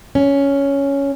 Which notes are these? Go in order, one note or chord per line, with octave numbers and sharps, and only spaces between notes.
C#4